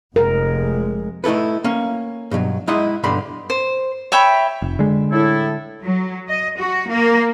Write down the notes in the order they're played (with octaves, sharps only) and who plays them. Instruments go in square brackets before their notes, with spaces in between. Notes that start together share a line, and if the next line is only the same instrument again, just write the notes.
[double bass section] F1 F2 G#3 [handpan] A#4
[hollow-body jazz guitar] A3 D#4 E4 A4 B4
A#3 C#4
G2 B2 F3 F#3
G#3 D#4 E4 D#5 F#5 C6
B1 G2 D3 G3 B5 C6
[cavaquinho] C5
C#5 E5 G5 B5
[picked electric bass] F1
D3 G#3
[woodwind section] A2 E4 A4
[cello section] F#3
D#5
F#4
A#3